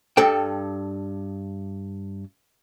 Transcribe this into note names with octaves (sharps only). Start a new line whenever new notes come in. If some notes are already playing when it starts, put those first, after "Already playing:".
G2 A4 G5